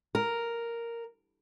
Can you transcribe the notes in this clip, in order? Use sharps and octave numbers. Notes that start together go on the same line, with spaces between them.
A#4